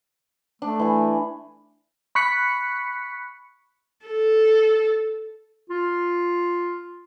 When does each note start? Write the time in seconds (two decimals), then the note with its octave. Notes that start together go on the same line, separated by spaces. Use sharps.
0.62 A3 D4
0.79 E3 G#5
2.15 B5 C#6 F#6 B6 C#7
4.06 A4
5.70 F4